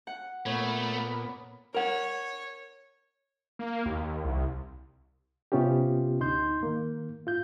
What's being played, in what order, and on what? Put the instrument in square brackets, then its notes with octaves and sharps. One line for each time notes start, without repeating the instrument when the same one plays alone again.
[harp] F#5
[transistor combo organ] A#2 B3 [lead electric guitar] A3 [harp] C#5
[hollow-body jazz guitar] A#4 F#5 [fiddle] C#5
[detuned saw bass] A#3
D#2
C2
[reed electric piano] C3 B3 C#4 F4 G4
D2 D#4 C6 G6
D#3 A#3
F4 G6